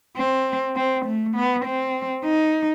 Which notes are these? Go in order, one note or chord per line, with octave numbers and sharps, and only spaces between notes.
C4
C4
A3
B3
C4
D#4